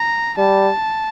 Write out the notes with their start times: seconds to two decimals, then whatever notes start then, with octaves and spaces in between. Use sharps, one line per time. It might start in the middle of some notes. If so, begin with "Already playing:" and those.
Already playing: A#5
0.38 G3 A5